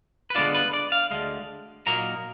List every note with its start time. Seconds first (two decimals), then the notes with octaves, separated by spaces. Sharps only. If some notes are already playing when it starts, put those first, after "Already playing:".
0.30 B4
0.35 D3 G#3 B3 D4 F4 D5
0.55 B4
0.73 D5
0.92 F5
1.11 D2 D3 G#3
1.86 A#2 F#3 A#3 D#4 A#5